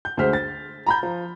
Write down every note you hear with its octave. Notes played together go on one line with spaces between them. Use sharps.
G6
D2 G#3 C5 F6 B6
A6
A#5 B5 G6
F3